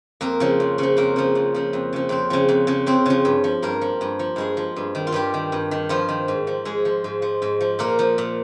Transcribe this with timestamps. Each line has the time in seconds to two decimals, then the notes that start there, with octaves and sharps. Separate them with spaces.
0.21 F2 A#3 A#4
0.40 C#3 F3
0.60 F2
0.78 C#3 F3
0.97 F2 A#3 A#4
1.16 C#3 F3
1.35 F2
1.54 C#3 F3
1.73 F2
1.93 C#3 F3
2.09 F2 C4 C5
2.30 C#3 F3
2.49 F2
2.67 C#3 F3
2.86 F2 C4 C5
3.06 C#3 F3
3.25 G2
3.44 F3
3.62 G2 A#3 A#4
3.81 F3
4.01 G2
4.19 F3
4.36 G2 G#3 G#4
4.57 F3
4.76 G2
4.95 D#3
5.07 F4
5.12 G2 G3 G4
5.34 D#3
5.52 G2
5.71 D#3
5.89 G2 F3 F4
6.09 D#3
6.28 G#2
6.47 F3
6.65 G#2 G#3 G#4
6.85 F3
7.04 G#2
7.22 F3
7.42 G#2
7.61 F3
7.79 A#2 A#3 A#4
7.99 F3
8.18 A#2